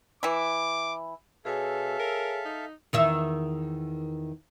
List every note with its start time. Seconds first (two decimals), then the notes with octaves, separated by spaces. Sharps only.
0.23 E3 E4 D6
1.45 B2 G#4 A4 C#5 E5 F5 G#5
2.00 A#4
2.45 D#4
2.93 E2 D#3 E5